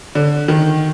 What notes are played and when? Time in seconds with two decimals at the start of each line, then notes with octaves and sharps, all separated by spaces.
0.15 D3
0.48 D#3